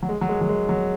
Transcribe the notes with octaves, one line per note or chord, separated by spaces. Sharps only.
F#3
G#3
F#3
G#3
F#3
G#3
F#3